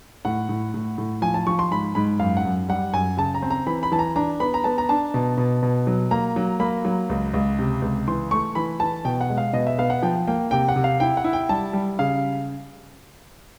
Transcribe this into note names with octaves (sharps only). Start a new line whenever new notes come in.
A2 F#5
A2
A2
A2
F3 G#5
A5
F3 C#6
C6
G#2 B5
G#2 B5
F#2 F5
F#5
F#2
G3 F#5
F#2 G#5
C#3 A5
A#5
C4
A#5
E3 B5
B5
E3 A5
A#5
D4 A#5
B3 B5
A#5
B3 A5
A#5
D4 A5
B2
B2
B2
F#3
A#3 A#5
F#3
A#3 B5
F#3
C#2
C#2
C3
C#2
E3 C6
A3 C#6
E3 B5
E3 A5
B2 G5
F#5
G#3
F5
B2 D#5
E5
B3 F5
F#5
F3 G5
A#3 G5
C3 G5
F#5
C3
F5
E4 G5
F#5
E4
G5
G3 A5
G3
C#3 F5